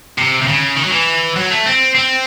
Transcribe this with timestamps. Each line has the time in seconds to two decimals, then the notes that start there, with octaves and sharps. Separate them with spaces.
0.18 C3
0.42 C3
0.47 C#3
0.76 D#3
0.84 F#3
0.92 E3
1.36 F#3
1.50 A3
1.66 C4
1.95 C4